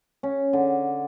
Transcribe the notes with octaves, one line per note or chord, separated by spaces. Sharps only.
C#4
D3